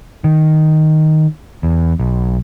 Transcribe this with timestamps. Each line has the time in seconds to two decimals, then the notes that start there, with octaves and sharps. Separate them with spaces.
0.24 D#3
1.63 E2
2.00 B1